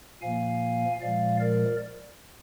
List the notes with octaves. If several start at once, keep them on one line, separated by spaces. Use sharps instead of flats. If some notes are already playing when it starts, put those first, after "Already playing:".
A#2 F3 A#3 F5 G#5
A#2 F3 G#3 D5 F5
A#4 D5